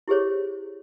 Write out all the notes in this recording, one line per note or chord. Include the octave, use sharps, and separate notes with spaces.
E4 G4 G#4 C5 C#5